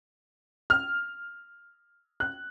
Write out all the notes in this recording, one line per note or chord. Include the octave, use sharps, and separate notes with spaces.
F6
F#6